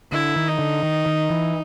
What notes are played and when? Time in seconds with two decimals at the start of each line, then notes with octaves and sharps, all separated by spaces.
0.12 D3 E4
0.36 D#3
0.48 D#4
0.59 D3
0.83 D#3
1.06 D#3
1.30 E3